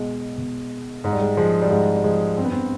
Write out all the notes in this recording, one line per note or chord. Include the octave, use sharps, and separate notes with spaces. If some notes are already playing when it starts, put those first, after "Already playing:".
Already playing: B2 G#3
B2
G#2 G#3
G3
G#3
F3 G#3
G3
G#2 G#3
G3
F3 G#3
G2 C4
B3
C4